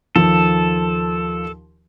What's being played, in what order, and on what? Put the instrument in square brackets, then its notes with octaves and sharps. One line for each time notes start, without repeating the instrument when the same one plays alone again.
[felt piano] D#2 F3 [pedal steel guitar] A4